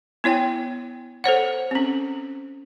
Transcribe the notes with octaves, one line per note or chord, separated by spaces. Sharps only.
B3 E4 C#5 G5
A4 C5 C#5 F#5
C4 C#4